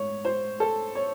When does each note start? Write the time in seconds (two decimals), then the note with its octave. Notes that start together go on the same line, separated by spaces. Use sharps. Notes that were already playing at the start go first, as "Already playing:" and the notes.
Already playing: G#2 C#5
0.25 C5
0.60 A4
0.95 C#5